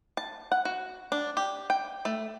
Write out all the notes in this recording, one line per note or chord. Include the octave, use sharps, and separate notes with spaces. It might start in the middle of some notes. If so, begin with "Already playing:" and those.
A5
F#5
F#4
D4
G4
G5
A3